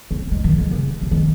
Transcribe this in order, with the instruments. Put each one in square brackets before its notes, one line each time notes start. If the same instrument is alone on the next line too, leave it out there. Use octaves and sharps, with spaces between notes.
[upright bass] C#4
G#3
D#3
D#3
C#3
C3
D#3